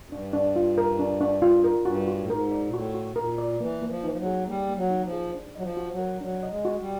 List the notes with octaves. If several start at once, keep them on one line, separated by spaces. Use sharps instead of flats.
F#2
G2 D4
D4
F4
A#4
D4
D4
F4
A#4
G2 F#4
F#4
A2
G#2 A#4
D5
A#2
A2 F#4
F#4
A#2 A#4
D5
E3 A#3
A#3
F3
E3 D#4
F3
F#3
G#4
G3 A#3
A#3
F#3
D#4
F3
G#4
D4
F#3 D#5
F3
F#4
F#3
A#4
F#3 D4
D#5
G#3
F#4
G3